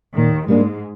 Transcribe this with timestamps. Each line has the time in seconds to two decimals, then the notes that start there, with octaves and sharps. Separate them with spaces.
0.16 D#2 A#2 D#3
0.48 G#2 G3 G#3 A#3 D4